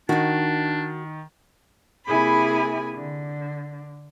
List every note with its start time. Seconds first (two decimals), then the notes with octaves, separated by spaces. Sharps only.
0.09 D#3 D4 D#4 F#4
2.05 C3 A#3 E4 G#4 G#5 B5
2.95 D3